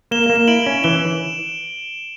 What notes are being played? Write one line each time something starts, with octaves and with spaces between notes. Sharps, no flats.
A#3 E7 G7
E7 G7
A#3
E7 G7
E4 D7 F#7
C#4
E3 E7 G7